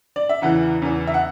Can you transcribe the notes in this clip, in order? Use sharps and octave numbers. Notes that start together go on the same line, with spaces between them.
D5
E5
E2 C#3 E3 F#5
E2 C#3 E3
E5
F#5